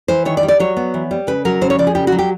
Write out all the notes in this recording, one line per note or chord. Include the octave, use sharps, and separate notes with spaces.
E3 C5
D#3 C#5
D5
G3
D5
F#3 C#5
B3
E3
G3
C#3 B4
F#3 A#4
C#3 C5
C#5
F3 D5
G#4
C#3 G4
F#4
F#3
G4